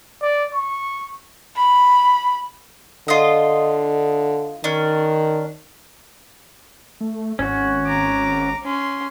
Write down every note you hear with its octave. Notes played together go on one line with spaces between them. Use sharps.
D5
C#6
B5
D3 F4 D#5
D#3 C#4 D4
A3
G#1 C#4 F#4
A#5 D6
C#4 C6